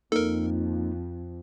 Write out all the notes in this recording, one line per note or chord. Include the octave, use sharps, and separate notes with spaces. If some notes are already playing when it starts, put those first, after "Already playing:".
F2 A#3 D#4 A4 A#4